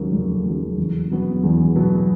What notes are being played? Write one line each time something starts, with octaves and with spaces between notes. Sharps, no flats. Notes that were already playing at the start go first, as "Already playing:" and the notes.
Already playing: D#2 C#3 F#3 A#3
F1
D#2 C#3 F#3 A#3
E2
B2 F#3 B3
E2
B2 F#3 B3